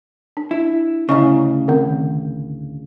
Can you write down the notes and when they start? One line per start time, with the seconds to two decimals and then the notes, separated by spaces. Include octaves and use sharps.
0.37 D4
0.51 E4
1.09 D2 A2 C#3 E4 D#5 C#6
1.68 D#3 C4